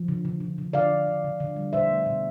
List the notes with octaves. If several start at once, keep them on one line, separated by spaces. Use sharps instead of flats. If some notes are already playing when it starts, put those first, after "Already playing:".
Already playing: F3
D3
D3
D3
D3
D3 D5 F5
D3
D3
D3
D3
G3
B2 C5 E5
A3
B2